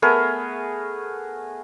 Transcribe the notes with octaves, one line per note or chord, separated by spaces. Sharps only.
A3 B3 G#4 A#4